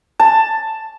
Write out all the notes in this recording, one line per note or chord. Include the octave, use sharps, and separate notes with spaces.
A5